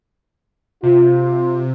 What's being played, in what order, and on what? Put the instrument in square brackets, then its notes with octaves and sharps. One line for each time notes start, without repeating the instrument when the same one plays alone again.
[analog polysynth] C3 [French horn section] F4